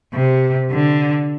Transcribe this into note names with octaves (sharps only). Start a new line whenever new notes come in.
C3
D3